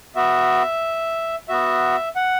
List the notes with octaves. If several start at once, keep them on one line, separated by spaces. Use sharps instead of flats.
B3 F#4 E5
B3 F#4 E5
F#5